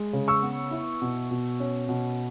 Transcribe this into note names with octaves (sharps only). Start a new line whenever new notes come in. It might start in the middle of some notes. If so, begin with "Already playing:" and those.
Already playing: G#3
C#3
C#6 E6
B3
E4
B2
B2
C#4
B2